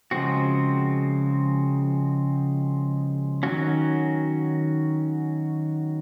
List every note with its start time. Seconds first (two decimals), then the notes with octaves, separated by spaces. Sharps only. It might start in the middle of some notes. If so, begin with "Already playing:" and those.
0.11 C#3 F3 G#3 C4 F#4
3.43 D#3 F#3 C#4 F#4